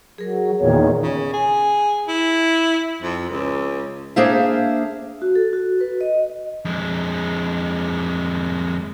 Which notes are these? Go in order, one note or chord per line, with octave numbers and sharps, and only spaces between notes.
F#3 G#4 A#4
E2 A#2 D#3 C#5
C#3
G#4
E4
F2
C#2
A#3 D4 G#4 C5 E5 F5
F#4
A4
F#4
B4
D#5
F2 G#3